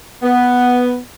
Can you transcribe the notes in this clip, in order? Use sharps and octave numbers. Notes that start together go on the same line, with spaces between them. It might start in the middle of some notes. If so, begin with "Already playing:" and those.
B3